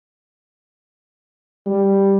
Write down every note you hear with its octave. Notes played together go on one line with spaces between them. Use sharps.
G3